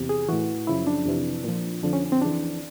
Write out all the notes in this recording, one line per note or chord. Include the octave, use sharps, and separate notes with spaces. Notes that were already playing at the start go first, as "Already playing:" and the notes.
Already playing: E2 C3
G#4
A2 E3 F#4
F#2 C#3 F3 E4
D4
F2 C3 E3
A#2 F3
F2 D3 F3 D4
C#4
C4
F2 C#3 E3 D4